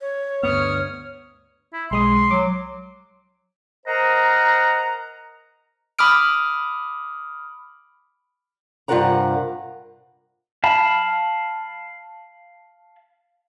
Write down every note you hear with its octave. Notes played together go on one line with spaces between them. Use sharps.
C#5
D2 G2 B3 C#6 D#6 F6
E4
B1 G#3 C6 D#6
F#3 D6
A#4 C5 D#5 F#5 A#5
B5 D6 D#6 F6 D7
G2 C3 F4 A#4 F#5 A#5
F5 A5 B5